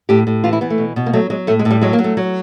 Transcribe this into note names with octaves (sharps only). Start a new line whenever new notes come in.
A2 G4
A2
E3 F4
E4
E3 B3
A3
B2
B2
A#3
F#3 A3
F#3 G#3
A2 A3
G#3
A2
G3
F#3 G#3
A#3
F#3
A3
F#3